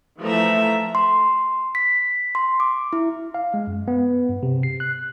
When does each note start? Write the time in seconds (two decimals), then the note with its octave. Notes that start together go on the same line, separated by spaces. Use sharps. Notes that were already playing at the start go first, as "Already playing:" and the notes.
0.21 E3 F3 A3 E5 A#5
0.95 C6
1.75 B6
2.35 C6
2.60 D6
2.93 E4
3.34 F5
3.54 G#3
3.67 F#2
3.88 B3
4.29 G2
4.43 C3
4.63 C7
4.80 F#6